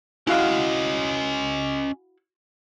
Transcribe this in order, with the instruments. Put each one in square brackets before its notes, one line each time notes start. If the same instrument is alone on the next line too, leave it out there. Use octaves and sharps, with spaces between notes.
[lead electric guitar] C#4 D#5 [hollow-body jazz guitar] E4 F#4 F5